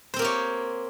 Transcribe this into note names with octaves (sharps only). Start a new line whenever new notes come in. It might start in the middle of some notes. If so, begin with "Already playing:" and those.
A#3 C4 G4 C5 C#5